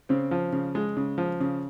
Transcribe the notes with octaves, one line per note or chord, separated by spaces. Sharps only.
C#3 C4
F3
C#3
G#3
C#3
F3
C#3